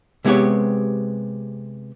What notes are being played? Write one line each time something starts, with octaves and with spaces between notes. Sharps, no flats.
C3 G#3 B3 G4 C#5